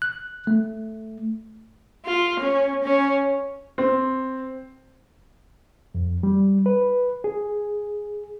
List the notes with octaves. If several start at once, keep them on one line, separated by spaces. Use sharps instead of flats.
F#6
A3
F4
C#4
C#4
C4
F2
G3
B4
G#4